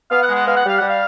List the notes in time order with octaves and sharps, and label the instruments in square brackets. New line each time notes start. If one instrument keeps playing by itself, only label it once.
[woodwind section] B3 F5
F#5
G#3
F#5
B3 F5
F#5
G3 F5
G3 F#5
F5